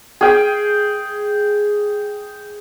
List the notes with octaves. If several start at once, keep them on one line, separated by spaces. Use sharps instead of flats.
G#4 G5